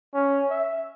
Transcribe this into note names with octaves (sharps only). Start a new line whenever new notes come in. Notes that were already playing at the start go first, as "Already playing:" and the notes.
C#4
E5